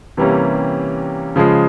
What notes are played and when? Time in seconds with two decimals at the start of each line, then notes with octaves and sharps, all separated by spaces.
0.17 C3 E3 G3 A#3 C#4
1.36 C#3 F3 G#3